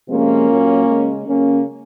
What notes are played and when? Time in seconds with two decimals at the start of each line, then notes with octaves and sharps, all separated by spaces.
0.08 C3 F3 G#3 A#3 C#4
0.48 A#2 F#3
0.87 C#3 G#3
1.26 C#3 F#3 A#3 C#4